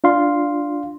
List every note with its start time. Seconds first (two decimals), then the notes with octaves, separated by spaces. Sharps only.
0.04 D4 F4 F5 C6